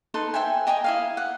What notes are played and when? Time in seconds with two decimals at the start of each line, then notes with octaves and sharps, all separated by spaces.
0.14 D#4 A4 B4 C6
0.34 C5 E5 G5 G#5
0.67 D#5 G5 G#5 A#5
0.84 E4 D#5 F5
1.17 F#5